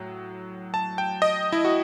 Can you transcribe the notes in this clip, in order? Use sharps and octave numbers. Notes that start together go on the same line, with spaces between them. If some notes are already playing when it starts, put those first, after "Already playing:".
Already playing: A2 F#3
A5
G5
D#5
E4
F#4